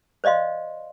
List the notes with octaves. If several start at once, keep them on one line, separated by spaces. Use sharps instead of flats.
C5 D5 D#5 F5 C6